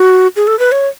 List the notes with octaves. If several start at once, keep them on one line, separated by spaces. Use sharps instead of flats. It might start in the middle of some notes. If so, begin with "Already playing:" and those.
Already playing: F#4
G#4
A4
B4
C#5